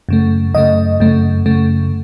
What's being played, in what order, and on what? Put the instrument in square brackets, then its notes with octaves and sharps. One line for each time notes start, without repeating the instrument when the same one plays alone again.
[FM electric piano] F#2 C#3 A3
F#2 C#3 A3 D#5
F#2 C#3 A3
F#2 C#3 A3